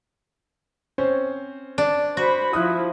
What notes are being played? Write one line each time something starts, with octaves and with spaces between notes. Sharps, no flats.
C4 C#4 C5
D4
F#4 C5 B5
F3 E4 D#6 F#6